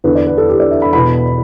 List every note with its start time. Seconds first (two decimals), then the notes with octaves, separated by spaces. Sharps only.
0.04 E2 D3 B4
0.15 D5
0.27 B4
0.38 A4
0.49 G4
0.60 D5
0.71 E5
0.82 B5
0.93 E2 B2 B5